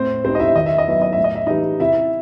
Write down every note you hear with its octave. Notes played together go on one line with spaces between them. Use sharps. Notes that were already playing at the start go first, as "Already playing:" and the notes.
Already playing: A2 C4 C5
G3 C4 D#4 C5
D#5
E4 E5
D#3 D#5
E5
D#5
F#3 B3 E4 E5
D#5
A2 E5
D#5
E5
E3 G3 D#4 D#5
C3 E4 E5